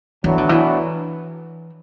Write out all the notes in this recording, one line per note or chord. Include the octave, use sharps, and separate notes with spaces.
A2 E3 F#3 B3 D4
D3
E3